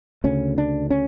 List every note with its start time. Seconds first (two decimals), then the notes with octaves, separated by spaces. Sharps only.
0.24 D2 C#3 C#4
0.58 D4
0.90 C#4